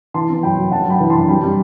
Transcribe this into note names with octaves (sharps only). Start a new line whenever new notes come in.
E3 A5 C6
B3
F#2 G5 B5
F#2
F#2 F#5 A5
F#2 G5 B5
E3
F#2 A5 C6
G3 G5 B5
G3